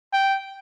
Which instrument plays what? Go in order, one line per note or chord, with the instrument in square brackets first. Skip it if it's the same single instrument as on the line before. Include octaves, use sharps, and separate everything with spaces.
[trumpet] G5